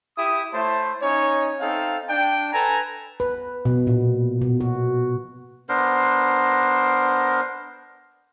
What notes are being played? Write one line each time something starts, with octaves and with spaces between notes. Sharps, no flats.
E4 G4 D#6
A3 E4 C5 C#5 A5
C#4 D#4 C#5
C4 D#4 A4 E5 F5
D4 G5
A4 B4 G#5 A#5
B4
B2
A#2
B2
F#4
B3 D4 A#4 C5